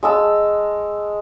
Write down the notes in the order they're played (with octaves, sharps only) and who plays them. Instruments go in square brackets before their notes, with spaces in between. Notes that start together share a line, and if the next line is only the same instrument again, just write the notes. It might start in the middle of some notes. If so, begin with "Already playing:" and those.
[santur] G#3 A5 E6